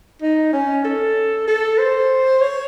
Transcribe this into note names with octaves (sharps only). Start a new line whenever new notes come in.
D#4
C#4
A4
A4
C5
C#5